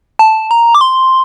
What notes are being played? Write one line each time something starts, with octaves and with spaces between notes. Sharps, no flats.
A5
A#5
D6
C6